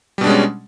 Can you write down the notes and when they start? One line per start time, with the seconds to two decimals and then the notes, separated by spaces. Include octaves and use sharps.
0.18 G3
0.21 B2
0.24 D4
0.27 G#3
0.30 C#4